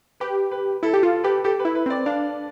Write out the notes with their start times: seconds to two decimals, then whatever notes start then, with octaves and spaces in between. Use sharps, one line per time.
0.20 G4 B4
0.51 B4
0.83 E4 A4
0.94 G4
1.03 F4 A4
1.24 G4 B4
1.44 G4 A4
1.59 B4
1.65 E4
1.75 B4
1.86 C4 D5
2.06 D4 F5